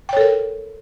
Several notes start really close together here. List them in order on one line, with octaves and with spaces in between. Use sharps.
G5 C#5 A4 A#4